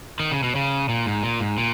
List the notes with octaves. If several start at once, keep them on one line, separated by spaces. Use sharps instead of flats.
D#3
C#3
B2
C#3
A#2
G#2
A#2
G#2
A#2